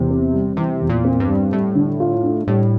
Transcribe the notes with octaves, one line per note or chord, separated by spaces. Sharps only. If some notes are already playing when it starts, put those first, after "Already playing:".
Already playing: E2 C3
C4
G3
C3 E3
E2
A#2
C4
G2
G3
A2 G3
D3
F4
D4
A2 G3